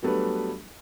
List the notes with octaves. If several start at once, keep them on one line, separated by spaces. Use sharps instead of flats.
F#3 G3 A3 B3 D4 B4